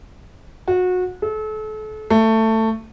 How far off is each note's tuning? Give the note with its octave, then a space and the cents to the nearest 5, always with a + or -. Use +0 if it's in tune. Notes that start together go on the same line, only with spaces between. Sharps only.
F#4 -25
A4 -35
A3 +15